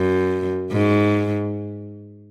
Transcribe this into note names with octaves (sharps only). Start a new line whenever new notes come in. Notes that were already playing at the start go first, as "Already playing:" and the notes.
Already playing: F#2
G#2